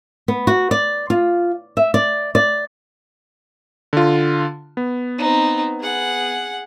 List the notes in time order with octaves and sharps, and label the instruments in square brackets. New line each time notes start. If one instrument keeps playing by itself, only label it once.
[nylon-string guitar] B3
F#4
D5
F4
E5
D5
D5
[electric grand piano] D3 F4
B3
[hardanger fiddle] C4 D#4
G#4 F#5